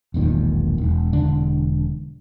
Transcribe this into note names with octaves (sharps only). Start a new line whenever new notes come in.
E1 B1 A#2 D#3
E1
E1 D3 D4